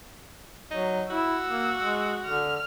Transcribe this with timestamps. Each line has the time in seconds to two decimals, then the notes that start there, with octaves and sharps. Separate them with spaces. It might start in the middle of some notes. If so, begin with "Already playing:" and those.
0.71 F#3 D#4
1.10 E4 F#4 E6
1.47 A#3
1.78 G#3
2.26 D3 F6